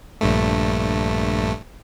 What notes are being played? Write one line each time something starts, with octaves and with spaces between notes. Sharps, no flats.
A#1 G2 A3